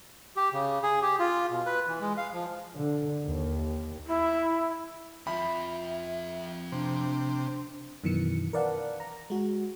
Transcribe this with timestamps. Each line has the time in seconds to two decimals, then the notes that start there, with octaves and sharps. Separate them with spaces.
0.37 G4
0.53 C#3
0.83 G#4
1.02 G4
1.20 F4
1.51 B2
1.66 B4
1.87 E3
2.01 G#3
2.18 F5
2.33 F3
2.76 D3
3.25 D#2
4.07 E4
5.27 F2 F3 E5 B5
6.72 C3 D4
8.04 F#2 B2 D#3 E3 C#7
8.53 A#4 B4 D5 F5 F#5 A5
9.00 A#5
9.30 G#3 F#4